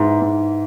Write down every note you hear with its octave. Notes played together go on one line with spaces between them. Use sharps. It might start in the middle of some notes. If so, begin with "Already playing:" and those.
Already playing: G#2 E3
G#2